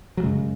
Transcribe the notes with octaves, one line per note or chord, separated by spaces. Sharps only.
F#3
F#2 C#3 G#3